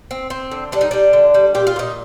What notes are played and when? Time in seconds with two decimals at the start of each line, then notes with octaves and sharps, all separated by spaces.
0.11 C4
0.30 C4
0.51 D3
0.72 G3 D4
0.81 D#4
0.91 G3 D4
1.13 D3
1.34 G3
1.55 A#2 G4
1.67 F4
1.76 A#2 D#4